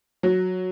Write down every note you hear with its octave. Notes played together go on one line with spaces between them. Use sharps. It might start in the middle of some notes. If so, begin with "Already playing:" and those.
F#3